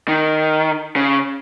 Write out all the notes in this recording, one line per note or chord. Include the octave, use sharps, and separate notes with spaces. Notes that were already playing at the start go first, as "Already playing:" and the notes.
D#3
C#3